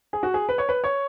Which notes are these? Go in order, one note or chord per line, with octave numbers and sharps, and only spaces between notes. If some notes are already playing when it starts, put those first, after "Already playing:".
G#4
F#4
G#4
B4
C#5
B4
C#5